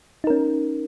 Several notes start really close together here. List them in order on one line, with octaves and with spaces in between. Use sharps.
D#4 A#4 C#4